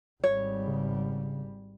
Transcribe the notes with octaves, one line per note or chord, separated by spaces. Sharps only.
G#1 G3 C#5
C#3